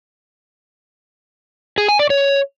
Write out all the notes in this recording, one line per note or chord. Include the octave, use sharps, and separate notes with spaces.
G#4
G#5
D5
C#5